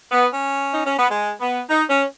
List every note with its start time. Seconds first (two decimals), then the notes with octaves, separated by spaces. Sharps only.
0.12 B3
0.32 C#4
0.72 D#4
0.85 C#4
0.97 B3
1.10 G#3
1.39 B3
1.69 D#4
1.89 C#4